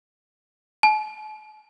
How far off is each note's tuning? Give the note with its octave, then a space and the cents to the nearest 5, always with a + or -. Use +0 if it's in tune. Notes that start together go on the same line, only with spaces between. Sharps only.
A5 -45